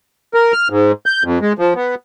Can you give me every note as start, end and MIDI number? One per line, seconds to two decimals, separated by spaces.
0.34 0.52 70
0.53 0.68 89
0.70 0.92 44
1.06 1.23 91
1.24 1.39 41
1.42 1.53 56
1.59 1.74 53
1.75 1.95 59